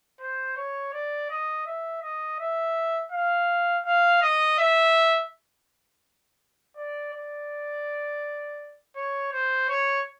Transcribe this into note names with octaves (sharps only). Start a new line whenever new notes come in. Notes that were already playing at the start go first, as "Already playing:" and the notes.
C5
C#5
D5
D#5
E5
D#5
E5
F5
F5
D#5
E5
D5
D5
C#5
C5
C#5